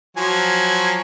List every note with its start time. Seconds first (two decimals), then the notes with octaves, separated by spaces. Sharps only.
0.17 F3 F#3 G#5